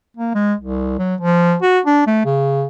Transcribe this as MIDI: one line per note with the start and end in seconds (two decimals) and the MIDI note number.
0.17 0.34 58
0.34 0.54 56
0.60 0.96 36
0.98 1.15 54
1.21 1.56 53
1.62 1.79 66
1.86 2.05 62
2.07 2.20 57
2.25 2.66 49